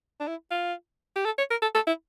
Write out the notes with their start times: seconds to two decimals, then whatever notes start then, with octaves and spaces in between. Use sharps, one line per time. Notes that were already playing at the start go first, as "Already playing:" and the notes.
0.20 D4
0.27 E4
0.51 F4
1.16 G4
1.25 A4
1.38 C#5
1.51 A#4
1.62 A4
1.75 A4
1.87 E4